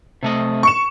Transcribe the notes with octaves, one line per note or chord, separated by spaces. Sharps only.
C3 A3 D#5
C#6 C#7 E7